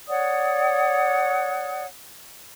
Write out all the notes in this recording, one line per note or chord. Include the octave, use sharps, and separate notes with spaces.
C#5 D5 F#5 D#6